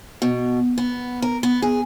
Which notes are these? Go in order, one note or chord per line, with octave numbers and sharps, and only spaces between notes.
B2
B3
A#4
B3
G#4